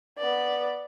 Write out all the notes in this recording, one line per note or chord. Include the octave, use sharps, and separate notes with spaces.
B3 D5